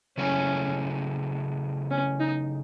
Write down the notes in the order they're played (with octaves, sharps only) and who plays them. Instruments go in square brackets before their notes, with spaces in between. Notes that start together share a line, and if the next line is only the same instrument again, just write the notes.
[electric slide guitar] C#3 F#3 A3 E4 G#4 [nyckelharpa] C#4
[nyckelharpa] C#4
D#4